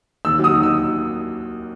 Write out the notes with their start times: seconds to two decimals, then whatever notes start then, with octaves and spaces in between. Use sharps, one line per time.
0.25 D#2 E6
0.39 F#3 D#6
0.52 D#3
0.63 E6